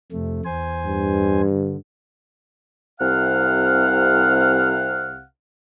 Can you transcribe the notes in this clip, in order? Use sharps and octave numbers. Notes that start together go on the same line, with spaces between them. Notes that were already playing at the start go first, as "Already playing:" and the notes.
F2 C3 A3
E2 C5 G#5
G2
D3
C2 C3 F5 F#5 F6